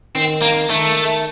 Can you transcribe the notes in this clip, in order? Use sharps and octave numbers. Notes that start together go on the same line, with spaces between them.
D#3 C4
A#3
D#3 A3